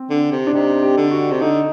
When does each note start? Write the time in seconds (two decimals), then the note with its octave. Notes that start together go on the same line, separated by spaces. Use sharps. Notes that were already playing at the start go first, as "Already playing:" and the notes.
Already playing: C4
0.10 D3
0.32 C3
0.47 D4
0.53 C3 D#4
0.83 G4
0.97 D3
1.11 F#4
1.31 C3
1.41 D3 D#4